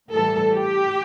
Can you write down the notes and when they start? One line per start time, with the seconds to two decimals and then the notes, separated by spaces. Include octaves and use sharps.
0.12 A2 E3 G3 A4
0.54 G4